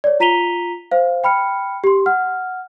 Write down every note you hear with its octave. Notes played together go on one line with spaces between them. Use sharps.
C#5 D5
F4 A#5 B6 D#7 F7 G7
C5 F5
G5 B5 F6 C#7
G4 C6
F#5 F6